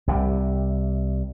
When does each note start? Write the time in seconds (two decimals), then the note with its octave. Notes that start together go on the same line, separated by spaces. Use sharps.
0.07 C2 C3 D#3 G3